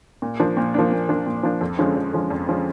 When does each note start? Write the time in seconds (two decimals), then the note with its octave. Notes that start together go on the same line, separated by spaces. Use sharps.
0.22 A#2
0.40 F3 A#3 D4
0.57 A#2
0.74 F3 A#3 D4
0.92 A#2
1.09 F3 A#3 D4
1.26 A#2
1.43 F3 A#3 D4
1.61 F2
1.78 D3 F3 G#3 C#4
1.96 F2
2.13 D3 F3 G#3 C#4
2.30 F2
2.48 D3 F3 G#3 C#4